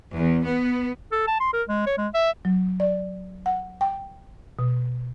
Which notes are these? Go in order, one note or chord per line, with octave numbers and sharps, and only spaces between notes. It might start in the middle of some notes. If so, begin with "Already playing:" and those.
E2
B3
A4
A5
C6
A#4
G#3
C#5
G#3
E5
F#3
D5
F#5
G5
B2